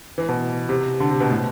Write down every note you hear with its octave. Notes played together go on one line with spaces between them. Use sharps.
E3
B2
C3
D3
C3
B2
A2